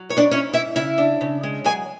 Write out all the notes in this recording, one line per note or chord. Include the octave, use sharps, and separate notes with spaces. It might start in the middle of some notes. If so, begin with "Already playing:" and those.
Already playing: F#3
G#2 C#5
D4 D5
C#4 E4 C#5
G#2 E4 E5
C#3 E4 E5
D4
C#3
G#3
F#3 G#4 G#5